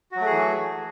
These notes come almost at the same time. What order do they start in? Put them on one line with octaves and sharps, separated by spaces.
F#4 F#3 A3 G#4 E3